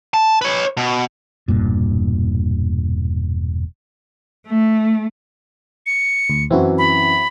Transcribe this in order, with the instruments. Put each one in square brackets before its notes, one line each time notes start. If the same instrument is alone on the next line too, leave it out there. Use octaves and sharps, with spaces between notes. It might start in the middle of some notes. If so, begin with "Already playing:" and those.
[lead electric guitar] A5
B4 C#5
B2
[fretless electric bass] E1 G2 A#2
[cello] A3
[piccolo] C#7
[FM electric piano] D2
[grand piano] F#2 E3 [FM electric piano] C4 E4 F#4
[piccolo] B5